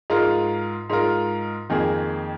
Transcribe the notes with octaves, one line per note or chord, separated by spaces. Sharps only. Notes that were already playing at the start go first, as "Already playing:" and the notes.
G#2 G#3 F4 A#4
G#2 G#3 F4 A#4
F2 D#3 A#3 G#4